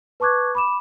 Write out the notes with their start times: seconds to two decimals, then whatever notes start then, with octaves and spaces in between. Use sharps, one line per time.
0.20 B4 A5 C#6 D6 F#6 G#6
0.55 B5 D6 E7